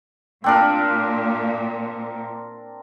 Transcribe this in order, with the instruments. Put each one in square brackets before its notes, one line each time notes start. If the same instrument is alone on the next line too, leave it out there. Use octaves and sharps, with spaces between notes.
[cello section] A#2 [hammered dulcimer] C4 D4 A#4